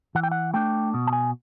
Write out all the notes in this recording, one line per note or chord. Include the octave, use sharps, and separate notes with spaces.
E3 F#5
G5
F#5
A3 D4 G5
B2
A5
G#5